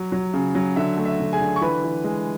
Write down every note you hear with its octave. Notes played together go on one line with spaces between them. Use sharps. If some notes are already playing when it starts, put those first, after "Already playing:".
Already playing: F#3
F#3
C#3
F#3
D3 E5
A3
E5
D3
G#4 G#5
D3
C#6
E3 B4 B5
E3
G#3